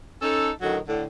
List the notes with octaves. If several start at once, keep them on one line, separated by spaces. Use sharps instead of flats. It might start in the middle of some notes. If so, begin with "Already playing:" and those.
C#4 D#4 A4
D2 A2 D#3 F#3
A2 D3